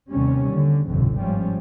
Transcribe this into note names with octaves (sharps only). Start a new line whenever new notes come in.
D#2 C3 G3 C#4
D3
G1 C2 F2 B2 D3
G#2 F3 G3 C#4